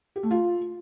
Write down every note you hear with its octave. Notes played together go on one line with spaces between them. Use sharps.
G4
A3
F4